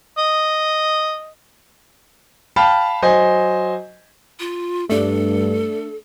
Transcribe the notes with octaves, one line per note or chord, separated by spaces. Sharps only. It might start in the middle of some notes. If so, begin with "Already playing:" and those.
D#5
F5 G5 A5 B5 F6
F#3 C5 D#5 G#5
F4
G2 A3 D4 A4